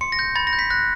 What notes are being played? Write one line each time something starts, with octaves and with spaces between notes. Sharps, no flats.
C6 C#7
A#6
G6
B5 A6
A#6
G6
B6
F#6 A#6